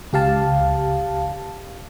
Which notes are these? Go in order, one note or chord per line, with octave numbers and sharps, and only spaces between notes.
C#2 G4 F5 A5